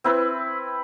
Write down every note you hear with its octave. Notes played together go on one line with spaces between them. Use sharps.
C4 E4 B4